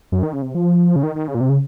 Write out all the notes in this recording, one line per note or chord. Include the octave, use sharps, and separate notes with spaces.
F#2
D#3
C#3
C3
F3
C#3
D#3
D#3
C#3
A#2
C3
C#3